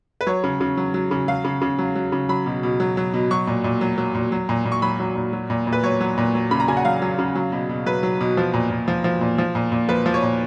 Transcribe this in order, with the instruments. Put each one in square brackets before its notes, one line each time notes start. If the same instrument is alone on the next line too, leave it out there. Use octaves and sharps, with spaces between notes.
[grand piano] B4
F#3 C#5
C#3
C#3
F#3
F#3
C#3
F#3 F5
C#3
C#3
F#3
F#3
C#3
F#3 B5
B2
B2
F#3
F#3
B2
F#3 C#6
A#2
A#2
F#3
F#3
A#2
F#3
A#2
A#2
C#6
F#3 B5
F#3
A#2
F#3
A#2
A#2
B4
F#3 C#5
F#3
A#2
F#3
C#3 B5
A#5
C#3 G#5
F#5
F#3 F5
F#3
C#3
F#3
B2
B2
F#3 B4
F#3
B2
F3
A#2
A#2
F3
F3
A#2
F3
A#2
A#2
F3 B4
F3
C#5
A#2